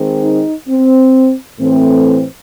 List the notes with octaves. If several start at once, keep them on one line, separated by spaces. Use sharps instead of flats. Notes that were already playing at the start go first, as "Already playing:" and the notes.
Already playing: D#3 G#3 C4
D#4
C4
A2 E3 A3 C4